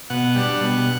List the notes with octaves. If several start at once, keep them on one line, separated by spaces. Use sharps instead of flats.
B2 F#5
G3 D4
B2